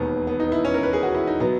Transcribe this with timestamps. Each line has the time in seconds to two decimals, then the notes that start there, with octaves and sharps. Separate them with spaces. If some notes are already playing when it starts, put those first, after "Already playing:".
Already playing: E1 D#2 D#3 B3
0.27 B3
0.40 D#4
0.52 E4
0.65 C#4
0.74 A#4
0.83 B4
0.93 G#4
1.03 F#4
1.15 E4
1.27 D#4
1.40 B2 F#3 B3